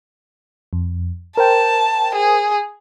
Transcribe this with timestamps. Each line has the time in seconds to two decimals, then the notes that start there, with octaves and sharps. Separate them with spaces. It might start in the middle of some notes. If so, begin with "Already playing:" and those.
0.73 F2
1.37 A#4 C5 G5 A5
2.15 G#4